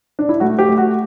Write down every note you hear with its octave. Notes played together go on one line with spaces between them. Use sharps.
D4
E4
A3 F#4
G4
A3
F#4